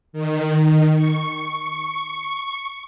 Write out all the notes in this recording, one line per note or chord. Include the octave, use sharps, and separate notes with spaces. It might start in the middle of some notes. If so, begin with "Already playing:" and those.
D#3
C#6